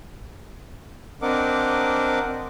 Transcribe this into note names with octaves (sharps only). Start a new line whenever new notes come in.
C4 D4 A#4 D#5 F#5 D6